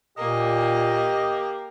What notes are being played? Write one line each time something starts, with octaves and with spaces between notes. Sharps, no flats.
A#2 A#3 G4 D#5